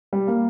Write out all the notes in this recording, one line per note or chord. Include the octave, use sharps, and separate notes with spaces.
G3
A#3